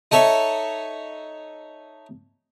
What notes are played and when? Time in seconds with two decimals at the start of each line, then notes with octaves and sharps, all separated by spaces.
0.11 D#4 A4 C#5 E5